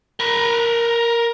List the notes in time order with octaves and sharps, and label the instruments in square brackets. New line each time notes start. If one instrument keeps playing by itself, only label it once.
[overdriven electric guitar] A#4 B5